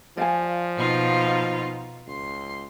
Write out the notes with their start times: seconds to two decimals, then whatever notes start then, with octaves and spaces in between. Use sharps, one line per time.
0.17 F3 D5 F5 G#5
0.76 B2 D#4 F4
2.07 C#2 C6